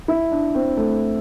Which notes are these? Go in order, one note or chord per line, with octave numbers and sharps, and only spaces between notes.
E4
D4
C4
A3